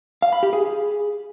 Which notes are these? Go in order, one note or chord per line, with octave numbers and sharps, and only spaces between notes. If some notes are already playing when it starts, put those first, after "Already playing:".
F5
B5
G4
G#4